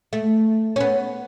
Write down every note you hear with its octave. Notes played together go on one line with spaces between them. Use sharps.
A3
C#4
B3